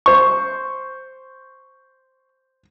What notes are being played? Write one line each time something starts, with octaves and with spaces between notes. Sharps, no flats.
C5 C#6